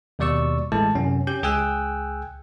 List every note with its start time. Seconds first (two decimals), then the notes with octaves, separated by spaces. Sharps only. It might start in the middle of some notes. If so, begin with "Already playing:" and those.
0.19 D#2 B2 G3 D5 C#6 E6
0.72 A1 G#3 A3 E4 A4 A5
0.95 F#2 C3 C#4
1.27 C#4 G4 G6
1.43 C#2 G#4 G5 G#5 E6 F#6